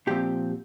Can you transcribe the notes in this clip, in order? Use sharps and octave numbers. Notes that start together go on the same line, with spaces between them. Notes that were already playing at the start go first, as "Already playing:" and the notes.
A#2 F3 C4 G4